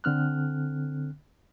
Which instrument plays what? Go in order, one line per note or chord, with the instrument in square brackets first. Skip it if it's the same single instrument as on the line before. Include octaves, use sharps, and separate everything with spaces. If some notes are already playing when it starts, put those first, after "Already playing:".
[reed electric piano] D3 C4 F6 F#6